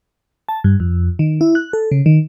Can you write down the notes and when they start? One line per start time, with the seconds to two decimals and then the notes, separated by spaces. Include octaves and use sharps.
0.49 A5
0.64 G2
0.80 F2
1.19 D#3
1.41 E4
1.55 F#6
1.73 A4
1.91 C#3
2.06 D#3